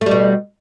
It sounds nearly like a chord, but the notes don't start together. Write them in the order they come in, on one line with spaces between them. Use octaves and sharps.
A3 G3 B2